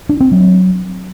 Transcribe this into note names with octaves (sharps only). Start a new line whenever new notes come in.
D4
C4
F#3